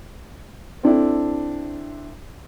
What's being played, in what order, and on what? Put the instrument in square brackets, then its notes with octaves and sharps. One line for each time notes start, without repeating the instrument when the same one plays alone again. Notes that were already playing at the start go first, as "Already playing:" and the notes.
[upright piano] C4 D4 E4 A4